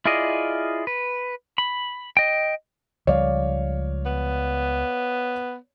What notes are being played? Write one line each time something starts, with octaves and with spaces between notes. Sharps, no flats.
E4 F4 G#4 D5 D#5
B4
B5
D#5 G5
C#2 F3 G3 C#5 D5 F5
B3